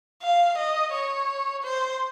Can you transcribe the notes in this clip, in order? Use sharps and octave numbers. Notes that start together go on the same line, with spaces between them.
F5
D#5
C#5
C5